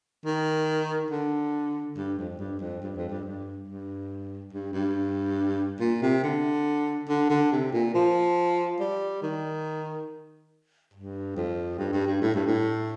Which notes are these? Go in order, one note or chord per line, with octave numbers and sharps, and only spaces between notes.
D#3
D3
G2
F2
G2
F2
G2
F2
G2
G2
G2
G2
G2
A#2
C3
D3
D3
D3
C3
A#2
F3
G3
D#3
G2
F2
G2
G2
G2
A2
G2
A2